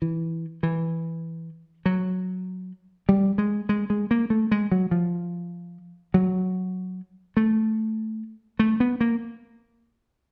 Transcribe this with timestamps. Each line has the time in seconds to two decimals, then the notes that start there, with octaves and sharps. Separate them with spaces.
0.02 E3
0.63 E3
1.86 F#3
3.09 G3
3.38 G#3
3.69 G#3
3.90 G#3
4.11 A#3
4.30 A3
4.51 G#3
4.72 F#3
4.91 F3
6.14 F#3
7.37 A3
8.59 A3
8.80 B3
9.01 A#3